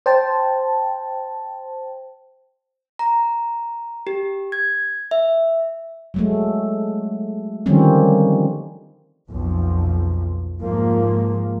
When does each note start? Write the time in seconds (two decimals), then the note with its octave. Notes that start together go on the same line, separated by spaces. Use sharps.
0.06 C5 G5 A5
2.99 A#5
4.07 G4
4.52 G#6
5.11 E5
6.14 F#3 G#3 A3
7.66 D3 D#3 F3 G3 C4 C#4
9.30 B1 F2 F3
10.61 G#2 F3 A#3